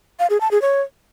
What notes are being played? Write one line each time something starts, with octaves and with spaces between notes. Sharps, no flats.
F5
G#4
A5
G#4
C#5